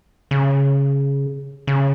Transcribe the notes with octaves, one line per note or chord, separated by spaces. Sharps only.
C#3
C#3